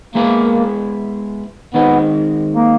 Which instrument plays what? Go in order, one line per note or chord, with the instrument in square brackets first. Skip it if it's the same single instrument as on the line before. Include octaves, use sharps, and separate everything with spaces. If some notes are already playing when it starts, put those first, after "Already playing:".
[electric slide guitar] G#3 B3 E4 G#4 B4 [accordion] A#3
[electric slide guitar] D#3 G#3 C4 D#4 [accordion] B3
[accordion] A#3